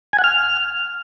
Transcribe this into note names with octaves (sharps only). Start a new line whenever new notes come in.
G#5
F#5
F6